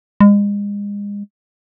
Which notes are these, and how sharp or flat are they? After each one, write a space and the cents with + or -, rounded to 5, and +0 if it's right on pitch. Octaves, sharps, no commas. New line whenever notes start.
G#3 -35